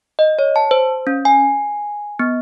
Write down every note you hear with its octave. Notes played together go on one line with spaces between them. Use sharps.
D#5
C#5
A5
C5
C#4
G#5
B3